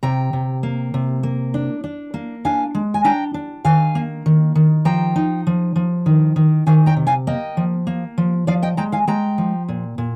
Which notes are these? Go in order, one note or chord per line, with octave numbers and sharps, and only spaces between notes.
C3 G5 A#5
C3
A#3
C3
A#3
D4
D4
A#3
D4 F5 G#5
G#3
G#5
D4 G5 A#5
D4
D#3 F5 G#5
A#3
D#3
D#3
F3 G5 A#5
D#4
F3
F3
D#3
D#3
D#3 F5 G#5
G5 A#5
C3
F5 G#5
A#3 D#5 G5
F3
A#3
F3
F3 D5 F5
D#5 G5
G#3 G5 A#5
F5 G#5
G#3 G5 A#5
F3
A#2
A#2